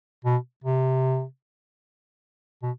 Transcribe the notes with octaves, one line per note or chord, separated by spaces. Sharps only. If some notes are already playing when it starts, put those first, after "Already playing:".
B2
C3
B2